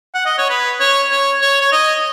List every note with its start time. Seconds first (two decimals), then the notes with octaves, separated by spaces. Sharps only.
0.14 F#5
0.26 D#5
0.38 C#5
0.50 B4
0.80 C#5
1.11 C#5
1.42 C#5
1.61 C#5
1.72 D#5